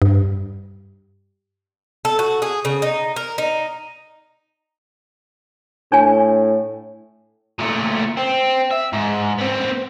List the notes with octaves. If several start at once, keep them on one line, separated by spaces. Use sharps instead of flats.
G2
A4
F#4
G#4
C#3
D#4
A#4
D#4
A2 D4 C#5 G#5
A#2 A3
C4
E5
G#2
B3 C4